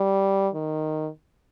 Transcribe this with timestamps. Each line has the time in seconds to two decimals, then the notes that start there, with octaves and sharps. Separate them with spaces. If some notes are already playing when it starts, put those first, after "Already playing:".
Already playing: G3
0.54 D#3